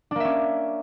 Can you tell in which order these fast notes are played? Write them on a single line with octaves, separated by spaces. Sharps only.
D4 A#3 E5 C#4